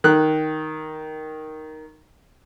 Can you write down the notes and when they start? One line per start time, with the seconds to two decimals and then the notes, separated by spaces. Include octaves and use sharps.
0.04 D#3 F#6